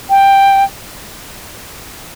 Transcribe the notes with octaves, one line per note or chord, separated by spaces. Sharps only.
G5